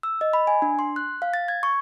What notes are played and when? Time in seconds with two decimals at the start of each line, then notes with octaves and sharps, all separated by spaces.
0.03 E6
0.21 D#5
0.33 B5
0.47 G#5
0.62 D4
0.79 C6
0.96 F#6
1.22 F5
1.34 A6
1.48 G#6
1.63 C#6